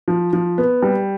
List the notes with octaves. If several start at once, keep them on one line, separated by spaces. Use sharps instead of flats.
F3
F3
B3
G3